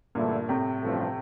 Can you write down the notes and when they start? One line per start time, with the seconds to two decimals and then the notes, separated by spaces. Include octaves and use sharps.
0.15 E2 G2 A#2 D3 A3 E4
0.49 A2 C3
0.83 A1 G2 F3 A3